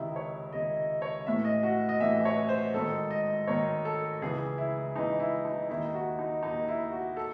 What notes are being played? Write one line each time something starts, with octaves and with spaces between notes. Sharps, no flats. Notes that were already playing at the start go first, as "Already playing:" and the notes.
Already playing: C#2 C3 D#3 E4
C#5
C#2 C3 D#3 D#5
D#5
C#5
A1 A2 E3 E5
D#5
F#4
D#5
A1 A2 E3 E5
C#5
C5
G#1 G#2 D#3 A4
D#5
G#1 G#2 D#3 C#5
A4
C#2 C#3 E3 G#4
E4
C#2 C#3 E3 D#4
E4
D#4
D#2 D#3 E4
F#4
D#4
D#2 D#3 D#4
E4
F#4
A4